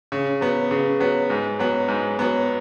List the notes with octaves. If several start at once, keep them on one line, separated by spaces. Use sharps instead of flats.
C#3
F#3 B3
C#3
F#3 B3
G#2
F#3 B3
G#2
F#3 B3